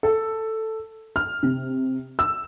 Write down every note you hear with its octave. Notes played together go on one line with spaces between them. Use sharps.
A4
F6
C3
E6